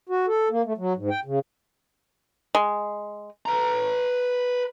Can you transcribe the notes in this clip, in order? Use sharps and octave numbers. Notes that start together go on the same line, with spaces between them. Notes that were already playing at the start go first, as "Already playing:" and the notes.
F#4
A4
A#3
A3
F#3
G#2
G5
C#3
G#3
B4 A#5